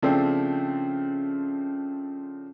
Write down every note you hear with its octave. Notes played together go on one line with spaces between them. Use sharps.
C#3 F3 A3 C4 D4